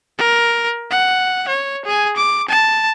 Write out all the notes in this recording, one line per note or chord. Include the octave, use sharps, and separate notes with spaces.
A#4
F#5
C#5
G#4 G#5
D6
A5